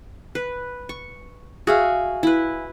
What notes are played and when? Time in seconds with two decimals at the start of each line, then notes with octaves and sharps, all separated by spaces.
0.35 B4
0.89 C#6
1.67 F#4 G#4 E5 F5
2.23 E4 B4